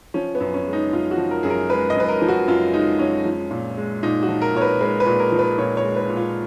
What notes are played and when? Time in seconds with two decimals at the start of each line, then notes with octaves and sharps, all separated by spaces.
0.14 F3 C#4
0.35 B3
0.40 F#2
0.54 C#4
0.67 G#3
0.73 D#4
0.92 F#2 F4
1.11 F#4
1.18 F3
1.31 A#4
1.43 F#2 G#4
1.50 A#4
1.70 G#3 B4
1.90 D#5
1.96 F#2 B4
2.08 A#4
2.22 F3
2.29 F#4
2.48 F#2 F4
2.73 G#3 D#4
2.99 F#2 C#4
3.25 F3
3.51 A#2
3.77 G#3
4.03 A#2 D#4
4.23 F#4
4.29 F3
4.42 A#4
4.54 A#2 C#5
4.62 B4
4.81 G#3 B4
5.00 B4
5.06 A#2
5.20 A#4
5.32 F3
5.39 B4
5.58 A#2 C#5
5.77 C#5
5.84 G#3
5.96 B4
6.09 A#2
6.17 F4